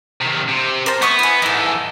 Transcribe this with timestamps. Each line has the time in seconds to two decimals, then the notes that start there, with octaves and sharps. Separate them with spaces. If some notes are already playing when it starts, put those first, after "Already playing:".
0.21 C3 D#3
0.48 C3
0.86 A#4 C5 A5
1.02 A3 B3 C#6 D#6
1.19 E4 G#5
1.42 G#2 E3 D#4 A4